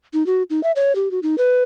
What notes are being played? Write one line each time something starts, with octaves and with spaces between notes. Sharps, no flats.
D#4
F#4
D#4
E5
C#5
G4
F#4
D#4
B4